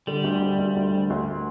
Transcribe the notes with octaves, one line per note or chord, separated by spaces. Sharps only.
D3 G3
D2
D2
D2
D2
D3
D2